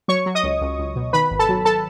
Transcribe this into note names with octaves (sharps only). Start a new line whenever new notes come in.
F#3 C#5 C#6
F#3
D#5 D#6
C#2
C#2
C#2
B2
D#3 B4 B5
G#1
A4 A5
F#3
A4 A5